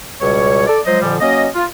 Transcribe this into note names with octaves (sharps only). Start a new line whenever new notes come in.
C#2 B2 G3 C#5
A4 D5
F3 F#3 G#3 C5 D#5
F2 A#2 D3 F3 G3
F#3 A#3 C#4 D#5
F4